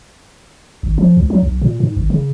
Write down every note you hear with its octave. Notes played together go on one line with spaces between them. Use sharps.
G#1
F3
C#2
F#3
B1
A#2
G#2
G#1
C#3